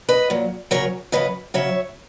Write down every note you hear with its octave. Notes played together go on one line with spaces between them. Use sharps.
B4 D#5
A#2 F#3
C#3 F#3 A#4 C#5
C#3 F#3 B4 D#5
C#3 F#3 C#5 E5